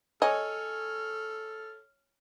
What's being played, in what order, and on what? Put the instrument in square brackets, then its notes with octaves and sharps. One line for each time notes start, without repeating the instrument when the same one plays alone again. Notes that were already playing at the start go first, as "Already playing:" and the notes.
[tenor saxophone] A4 [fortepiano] C#5 G#5 [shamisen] D#5 [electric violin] F6